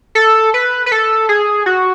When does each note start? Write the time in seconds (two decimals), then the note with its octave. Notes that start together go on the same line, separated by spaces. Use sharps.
0.15 A4
0.54 B4
0.86 B4
0.92 A4
1.29 G#4
1.66 F#4